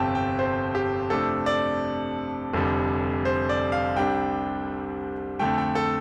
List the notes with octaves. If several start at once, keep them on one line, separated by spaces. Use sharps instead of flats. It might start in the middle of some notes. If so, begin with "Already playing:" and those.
Already playing: G1 F2 C3 G5 A5
G5
C5
G4
F2 C3 A3 D4 A4
D5
F1 F2 D3 G3
C5
D5
F5
C2 C3 G3 D4 G5
F2 D3 A3 G5
G5
A4